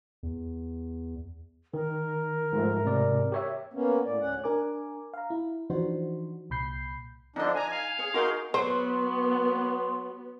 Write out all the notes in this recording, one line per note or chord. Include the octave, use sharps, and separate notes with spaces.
E2
D#3 A#4
G#2 F3 A3
G#2 C3 D5
G4 C#5 E5
A#3 B3 C#4
A2 D5
D2 C#4 F#5
D4 A#4 G#5 D6
F5 A#5
E4
E3 F3 D4 D#4 F#4 C5
C2 A#2 B5 G6 C7
D3 F3 D4 D#4 D#5
G#5 A#5
F5
G#4 C#5
D#4 F#4 G#4 A#4 C6
F#3 B3 F#4 C5 C6